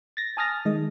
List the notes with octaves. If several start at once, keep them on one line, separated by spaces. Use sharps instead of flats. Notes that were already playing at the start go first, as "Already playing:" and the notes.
A6 A#6
G#5 A5 D#6 F6 A6 A#6
D#3 G#3 D#5